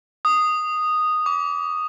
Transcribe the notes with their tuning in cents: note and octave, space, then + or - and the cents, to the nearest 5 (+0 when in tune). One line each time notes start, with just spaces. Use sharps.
D#6 -5
D6 -30